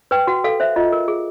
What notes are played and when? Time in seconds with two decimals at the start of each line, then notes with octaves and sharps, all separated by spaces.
0.11 B4 G5
0.27 F#4 F#5
0.44 A4 F5
0.60 C5 E5
0.76 F4 D#5
0.92 A#4
1.08 G#4